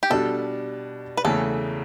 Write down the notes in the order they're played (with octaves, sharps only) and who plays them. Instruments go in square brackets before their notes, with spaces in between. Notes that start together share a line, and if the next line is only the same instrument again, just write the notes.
[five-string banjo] G4
[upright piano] B2 G3 D4 [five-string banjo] A4
[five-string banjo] B4
[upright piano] E2 C#3 E3 A3 [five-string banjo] A4